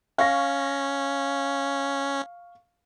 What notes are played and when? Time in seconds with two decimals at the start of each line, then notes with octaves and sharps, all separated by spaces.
0.18 C#4 F5 C#6 A#6